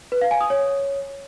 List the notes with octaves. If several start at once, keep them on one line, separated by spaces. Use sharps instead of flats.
B4
F5
G#5
D#6
C#5